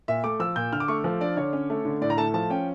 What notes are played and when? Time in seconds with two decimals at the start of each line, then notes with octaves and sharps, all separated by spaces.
0.08 A#2 E5
0.24 A3 D6
0.40 F3 E6
0.56 A#2 G6
0.73 D3 F6
0.80 D6
0.88 A3 C#6
1.04 F3
1.21 D4 D5
1.37 D3 C#5
1.53 C#4
1.70 A3
1.85 D3
2.01 A2 D5
2.10 A#5
2.17 A3 A5
2.34 F3 A5
2.50 C#4 G5